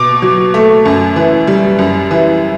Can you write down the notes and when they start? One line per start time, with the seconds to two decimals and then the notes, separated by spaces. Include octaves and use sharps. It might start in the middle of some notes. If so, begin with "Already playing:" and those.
Already playing: B2 D6
0.22 F#3
0.54 A3
0.85 F#2
1.16 E3
1.47 G3
1.79 F#2
2.11 E3